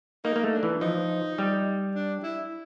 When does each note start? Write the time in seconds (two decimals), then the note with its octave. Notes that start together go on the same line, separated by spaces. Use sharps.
0.25 A#3 D#4
0.36 A#3
0.43 A3
0.53 D4
0.63 E3
0.81 F3 D#4
1.38 G3
1.95 D4
2.23 E4